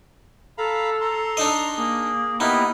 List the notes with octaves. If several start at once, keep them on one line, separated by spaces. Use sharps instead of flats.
A4 F5 A#5 B5
A#5 C6
D4 D#4 D#5
A#3 G#4
B3 D#4 E4 G4 A#4 B4